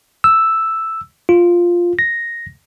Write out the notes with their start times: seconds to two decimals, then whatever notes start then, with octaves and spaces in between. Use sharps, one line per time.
0.24 E6
1.29 F4
1.99 A#6